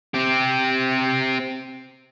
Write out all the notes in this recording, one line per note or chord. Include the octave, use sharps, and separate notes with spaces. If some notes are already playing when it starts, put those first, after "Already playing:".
C4 G4